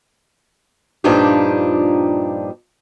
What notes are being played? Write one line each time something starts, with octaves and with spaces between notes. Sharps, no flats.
G2 A#2 F3 D4 D#4 G4